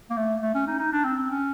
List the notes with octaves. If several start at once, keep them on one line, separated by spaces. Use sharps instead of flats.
A#3
A3
A3
C#4
D#4
D#4
D4
C4
C4
C#4